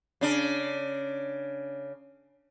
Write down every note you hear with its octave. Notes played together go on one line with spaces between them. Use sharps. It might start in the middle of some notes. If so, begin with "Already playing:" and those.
C#3 D4